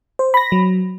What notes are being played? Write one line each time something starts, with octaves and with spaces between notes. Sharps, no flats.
C5
B5 A#6
F#3